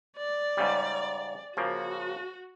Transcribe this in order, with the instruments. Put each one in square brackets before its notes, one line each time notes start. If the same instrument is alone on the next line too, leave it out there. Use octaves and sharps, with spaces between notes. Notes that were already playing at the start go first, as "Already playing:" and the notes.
[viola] D5
[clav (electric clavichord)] G#2 C#3 G3
[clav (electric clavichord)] C#3 F3 A#3 [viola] F#4